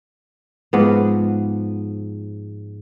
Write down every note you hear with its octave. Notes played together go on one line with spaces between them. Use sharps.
G#2 F3 B3